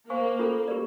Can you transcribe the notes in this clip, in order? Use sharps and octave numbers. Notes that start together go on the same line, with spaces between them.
A#3 C5 F5 G#5 C#6
C#4 F4 A4
G4 A#4 D5